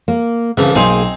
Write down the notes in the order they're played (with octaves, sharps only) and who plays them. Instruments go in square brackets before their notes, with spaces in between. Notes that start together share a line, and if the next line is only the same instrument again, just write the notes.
[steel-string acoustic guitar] A#3
[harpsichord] C2 E3 F3 [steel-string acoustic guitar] C#3
[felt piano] B1 C6 [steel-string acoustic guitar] A#3 G#4 [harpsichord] C4 D#4 G#5